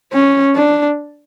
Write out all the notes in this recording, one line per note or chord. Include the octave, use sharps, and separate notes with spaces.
C#4
D4